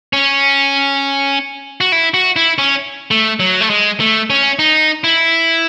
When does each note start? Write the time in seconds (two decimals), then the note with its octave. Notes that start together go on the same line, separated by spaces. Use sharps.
0.13 C#4
1.81 F#4
1.92 E4
2.14 F#4
2.36 E4
2.58 C#4
3.11 A3
3.40 F#3
3.61 A3
3.70 G#3
4.00 A3
4.30 C#4
4.59 D#4
5.04 E4